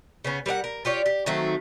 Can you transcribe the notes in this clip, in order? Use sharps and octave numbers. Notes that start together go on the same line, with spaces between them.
C#3 B3 C#4
G3 A#4 D5 F#5
A#4
F4 G4 C#5 D5
G4
D#3 F#3 A3 C4